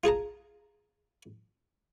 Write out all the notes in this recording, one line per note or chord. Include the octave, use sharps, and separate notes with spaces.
F4 G#4 A5 A#5